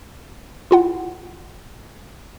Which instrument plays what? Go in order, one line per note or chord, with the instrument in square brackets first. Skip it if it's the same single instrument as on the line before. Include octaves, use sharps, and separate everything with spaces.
[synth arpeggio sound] E4 F4 F#5